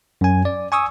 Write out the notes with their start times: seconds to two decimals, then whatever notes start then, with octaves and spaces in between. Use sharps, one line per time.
0.21 F#2 G#5
0.45 D5
0.72 G#5 C#6 D#6 E6